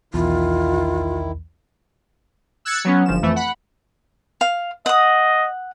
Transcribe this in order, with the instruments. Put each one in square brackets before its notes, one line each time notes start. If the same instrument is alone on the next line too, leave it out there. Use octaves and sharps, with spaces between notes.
[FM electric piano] B1 E2 [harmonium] D#3 E4 [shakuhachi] F4
[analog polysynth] E6 F#6 G#6 A6 C#7
F#3 B3 C#4
G1 F3 E7
F2 E3 A3
F#5 B5
[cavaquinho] F5
[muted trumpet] D#5 [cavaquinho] F#5 D#6